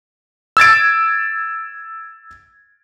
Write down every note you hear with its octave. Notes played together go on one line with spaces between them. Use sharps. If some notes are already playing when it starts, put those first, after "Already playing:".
E6 G#6 A6 D7